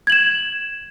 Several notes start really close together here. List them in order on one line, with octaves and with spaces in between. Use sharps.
G#6 F#7 E7